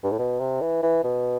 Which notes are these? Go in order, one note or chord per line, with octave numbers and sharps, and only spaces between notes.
G2
A2
B2
C3
E3
E3
B2